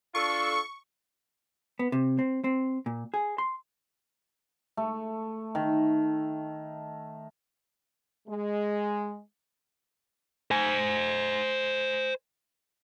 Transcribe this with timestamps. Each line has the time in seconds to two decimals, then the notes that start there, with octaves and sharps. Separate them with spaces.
0.15 D4 F4 A4 C#6
1.79 B3
1.92 C3
2.19 C4
2.44 C4
2.86 A#2
3.14 G#4
3.38 C6
4.77 A3
5.55 D#3
8.28 G#3
10.51 C5 G#5